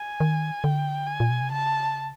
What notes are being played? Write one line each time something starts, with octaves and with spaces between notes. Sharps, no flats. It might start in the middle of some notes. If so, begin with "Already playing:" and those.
Already playing: G#5
D#3
D3 G5
G#5
A#2
B2
C3
C#3 A5